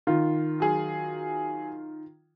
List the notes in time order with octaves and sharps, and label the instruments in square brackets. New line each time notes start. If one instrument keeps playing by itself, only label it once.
[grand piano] D#3 F4
[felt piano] F#3 G#4